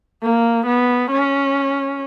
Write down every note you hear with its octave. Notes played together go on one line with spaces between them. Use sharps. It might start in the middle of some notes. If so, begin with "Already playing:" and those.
A#3
B3
C#4